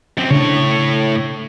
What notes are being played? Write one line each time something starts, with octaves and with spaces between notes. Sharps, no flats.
F#2 C4
A2 C#3 D4 C#5